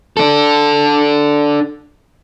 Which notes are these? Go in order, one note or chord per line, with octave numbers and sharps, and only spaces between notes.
D4 A4